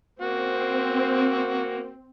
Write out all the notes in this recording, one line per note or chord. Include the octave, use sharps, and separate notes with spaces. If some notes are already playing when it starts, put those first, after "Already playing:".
A#3 C4 F#4